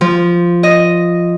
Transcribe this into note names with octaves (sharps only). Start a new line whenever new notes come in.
F3
D#5